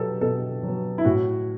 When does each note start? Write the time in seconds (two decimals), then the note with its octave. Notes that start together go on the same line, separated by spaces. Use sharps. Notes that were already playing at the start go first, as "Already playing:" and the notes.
Already playing: B2 F#3 B3 G4 A4
0.21 B2 A4
0.63 F#3 B3
0.98 E4
1.05 A2 F#4